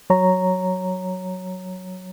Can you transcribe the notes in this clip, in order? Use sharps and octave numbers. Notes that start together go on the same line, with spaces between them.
F#3 C#5 A#5